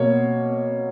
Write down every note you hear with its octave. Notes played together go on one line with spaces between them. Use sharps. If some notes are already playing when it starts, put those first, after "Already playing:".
Already playing: B2 A#3 C#5